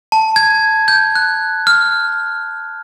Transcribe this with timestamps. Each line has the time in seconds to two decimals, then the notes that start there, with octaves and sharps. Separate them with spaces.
0.12 A5
0.36 G#6
0.88 G6
1.15 F#6
1.67 F6